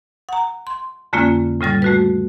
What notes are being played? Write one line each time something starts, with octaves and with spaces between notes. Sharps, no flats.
F#5 A#5
C6
F2 D3 G#3 A#3 C#4 F4
A2 C#3 G3 A6
A3 F#4 B4